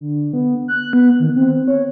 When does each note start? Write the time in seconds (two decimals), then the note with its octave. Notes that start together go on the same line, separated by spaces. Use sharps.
0.01 D3
0.33 B3
0.68 F#6
0.93 B3
1.20 D#3
1.36 C4
1.68 C#5